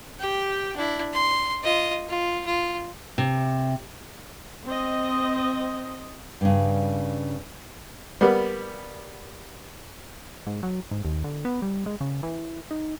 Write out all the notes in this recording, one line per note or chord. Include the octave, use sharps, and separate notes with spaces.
G4 G5
D4 E4
C6
F4 D#5
F4
F4
C3
C4 D#5
G2 C#3
G3 A#3 B3
G#2
F#3
G#2
D#2
D3
B3
G3
G#3
C#3
E3
D#4